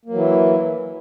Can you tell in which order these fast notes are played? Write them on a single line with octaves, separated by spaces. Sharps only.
A#3 F#3 E3 E4